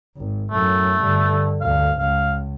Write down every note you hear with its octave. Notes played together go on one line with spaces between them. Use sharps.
G#1
F#2 A2 A3
G2 D3
D2 F5
C#2 F5